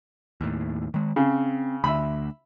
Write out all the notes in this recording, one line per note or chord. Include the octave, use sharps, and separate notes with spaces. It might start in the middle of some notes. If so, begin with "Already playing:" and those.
D#2 A2
D#3 G#3
C#3 C4
D2 D3 E5 B5